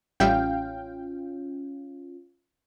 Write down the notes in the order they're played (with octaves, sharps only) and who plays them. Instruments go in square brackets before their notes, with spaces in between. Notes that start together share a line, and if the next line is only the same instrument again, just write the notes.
[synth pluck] A1 G3 E5 [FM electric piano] C#4 F4 [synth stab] F5 G5